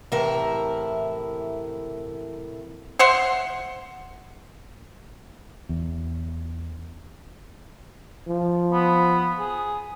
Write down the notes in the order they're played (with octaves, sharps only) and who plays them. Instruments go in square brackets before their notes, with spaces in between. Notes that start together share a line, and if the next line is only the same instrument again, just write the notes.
[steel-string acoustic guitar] A2 C3 E3 E4 A#4 E5
[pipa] C5 E5 F#5 C6
[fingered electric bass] E2
[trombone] F3
[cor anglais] B3
G#4